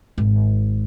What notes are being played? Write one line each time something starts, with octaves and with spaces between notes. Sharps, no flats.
G#1